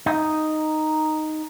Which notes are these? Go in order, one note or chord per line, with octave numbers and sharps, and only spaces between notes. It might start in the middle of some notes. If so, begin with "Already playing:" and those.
D#4